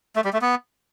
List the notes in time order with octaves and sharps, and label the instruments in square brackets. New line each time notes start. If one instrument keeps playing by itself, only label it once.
[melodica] A3
G3
A3
B3